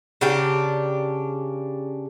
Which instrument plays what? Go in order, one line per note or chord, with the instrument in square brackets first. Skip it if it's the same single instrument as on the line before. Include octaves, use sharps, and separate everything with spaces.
[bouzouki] C#3 D4 G4 A#4